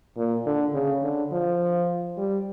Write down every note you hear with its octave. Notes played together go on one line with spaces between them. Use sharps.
A#2
D3
C#3
D3
F3
G3